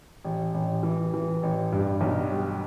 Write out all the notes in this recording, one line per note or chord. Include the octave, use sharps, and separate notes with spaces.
A1
A1
E3
E3
A1
G2
B1
G3